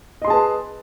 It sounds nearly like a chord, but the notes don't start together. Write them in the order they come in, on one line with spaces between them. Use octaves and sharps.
D#5 C6 G#4 A5 B4